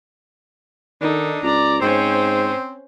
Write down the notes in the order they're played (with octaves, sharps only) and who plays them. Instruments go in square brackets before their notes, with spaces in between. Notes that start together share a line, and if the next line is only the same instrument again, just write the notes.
[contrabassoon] D#3 [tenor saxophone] D4 [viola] D#4 A4
[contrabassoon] C#2 [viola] D5 A#5
[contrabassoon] G#2 [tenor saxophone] C4 [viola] C#4 C5